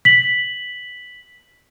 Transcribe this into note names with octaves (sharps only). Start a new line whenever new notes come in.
B6 F#7